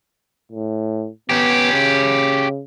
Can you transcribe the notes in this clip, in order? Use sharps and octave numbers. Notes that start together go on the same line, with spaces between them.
A2
B3 C#4 G4
C#3